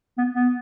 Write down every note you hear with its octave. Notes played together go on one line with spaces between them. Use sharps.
B3
B3